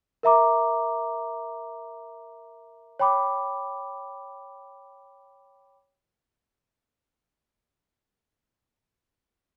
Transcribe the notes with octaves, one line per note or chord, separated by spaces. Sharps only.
A#4 E5 A#5 D6
C#5 G5 B5 D6